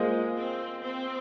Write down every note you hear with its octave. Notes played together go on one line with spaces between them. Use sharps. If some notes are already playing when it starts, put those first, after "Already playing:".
Already playing: G#3 A#3 F4 G#4 C5 D#5
C4
C4